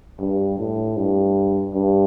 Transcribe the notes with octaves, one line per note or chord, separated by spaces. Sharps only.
G2
A2
G2
G2